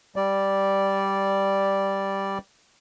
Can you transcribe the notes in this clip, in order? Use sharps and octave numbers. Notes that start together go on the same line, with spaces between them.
G3 D5